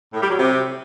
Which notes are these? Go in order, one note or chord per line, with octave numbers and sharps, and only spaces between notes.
A2
G3
F#3
C3